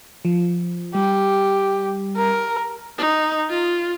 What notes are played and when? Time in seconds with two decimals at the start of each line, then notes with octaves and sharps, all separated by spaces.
0.25 F3
0.95 G3 G4
2.17 A#4
2.98 D#4
3.50 F4